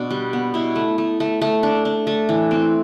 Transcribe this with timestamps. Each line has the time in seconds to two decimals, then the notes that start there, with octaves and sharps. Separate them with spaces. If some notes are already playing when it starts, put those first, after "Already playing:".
Already playing: B2 D4
0.10 G3
0.33 B3
0.54 B2 E4
0.76 A3
0.98 A3
1.20 A3
1.42 A3
1.63 D4
1.85 D4
2.07 A3
2.29 E3
2.51 C4